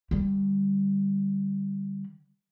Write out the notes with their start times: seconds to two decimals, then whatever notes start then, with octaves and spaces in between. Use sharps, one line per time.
0.11 D3 G3